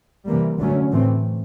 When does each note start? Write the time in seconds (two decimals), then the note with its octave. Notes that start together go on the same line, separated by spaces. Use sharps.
0.26 C3 E3 G3 A#3
0.58 D3 F#3 A3 C#4
0.91 A2 E3 A3 C4